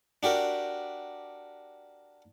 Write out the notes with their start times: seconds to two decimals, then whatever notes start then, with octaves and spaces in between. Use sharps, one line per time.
0.23 D4 F#4 G4 A#4